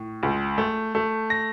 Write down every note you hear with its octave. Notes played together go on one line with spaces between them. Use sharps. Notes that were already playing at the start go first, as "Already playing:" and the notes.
Already playing: A2
C#2
A3
A3
A#6